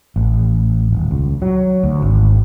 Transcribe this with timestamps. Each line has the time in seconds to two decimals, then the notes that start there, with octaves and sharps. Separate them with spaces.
0.16 A1
0.92 D#1
1.11 C#2
1.42 F#3
1.83 D2
2.02 G#1